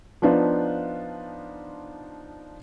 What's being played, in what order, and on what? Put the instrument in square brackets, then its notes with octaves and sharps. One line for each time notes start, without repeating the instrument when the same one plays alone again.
[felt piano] F3 B3 D4 D#4 F4